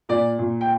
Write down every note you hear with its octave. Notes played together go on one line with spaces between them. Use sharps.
A#2 D5
A#2
G5